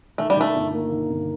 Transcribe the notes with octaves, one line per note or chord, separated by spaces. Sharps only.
D#3 A3
G3
D#3 A3
G1
A#3
D#3
G1